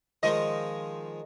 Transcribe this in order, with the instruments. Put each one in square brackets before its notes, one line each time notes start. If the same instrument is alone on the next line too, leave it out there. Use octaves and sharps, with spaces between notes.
[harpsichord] D#3 F3 G#3 [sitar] D#5